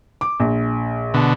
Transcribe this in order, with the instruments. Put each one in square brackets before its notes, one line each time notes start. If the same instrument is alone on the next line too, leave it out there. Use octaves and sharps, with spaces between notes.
[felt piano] D6
A#1
[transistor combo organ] B2 D3